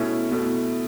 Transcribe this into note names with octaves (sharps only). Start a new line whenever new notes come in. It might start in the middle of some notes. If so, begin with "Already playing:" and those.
Already playing: B2 A3 C#4 E4
B2 A3 E4